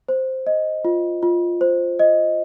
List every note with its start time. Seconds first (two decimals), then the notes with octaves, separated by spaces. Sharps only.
0.09 C5
0.47 D#5
0.85 F4
1.23 F4
1.61 C5
1.99 D#5